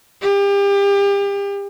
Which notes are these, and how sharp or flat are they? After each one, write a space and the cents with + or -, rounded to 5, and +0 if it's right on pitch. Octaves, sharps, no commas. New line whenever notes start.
G4 +35